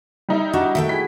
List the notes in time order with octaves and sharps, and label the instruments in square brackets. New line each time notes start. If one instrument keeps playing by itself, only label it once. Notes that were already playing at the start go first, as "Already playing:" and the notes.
[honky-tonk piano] G3 D#4 E4
[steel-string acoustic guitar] D4 [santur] F#4
[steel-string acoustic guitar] D#3 A3 G5 [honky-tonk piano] E5
[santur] E4 G#4 [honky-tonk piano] B6